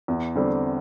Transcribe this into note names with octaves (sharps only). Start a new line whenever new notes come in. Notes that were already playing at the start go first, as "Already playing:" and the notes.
E2
D3 G3 C4